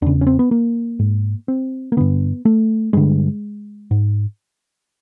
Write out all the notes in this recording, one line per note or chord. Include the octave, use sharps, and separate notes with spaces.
E2 C#3 D4
C#4
C4
B3
A#3
G#2
C4
A#3
G2 D3 B3
A3
G2 D3 G#3
G#2